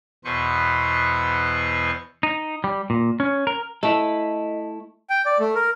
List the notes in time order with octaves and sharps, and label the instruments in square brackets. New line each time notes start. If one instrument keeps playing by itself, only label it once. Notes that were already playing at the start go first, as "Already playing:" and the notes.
[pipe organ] E2 B2 B4 C5 C#6
[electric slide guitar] D#4
G3
A#2
C#4
A#4
[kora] A3 [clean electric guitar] E4 A4 [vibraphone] D#5
[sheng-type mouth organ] G5
D5
A3
A#4